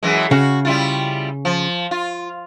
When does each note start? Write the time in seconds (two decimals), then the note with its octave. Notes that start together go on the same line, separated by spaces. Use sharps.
0.03 F#2 E3 G#3
0.31 C#3 F#4
0.65 G3 E4 F4
1.45 F3
1.91 F4